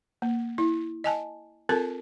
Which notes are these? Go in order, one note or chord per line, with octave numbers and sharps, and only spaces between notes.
A#3
E4
D#5 G#5 A5
C4 F4 A4 A#4 A5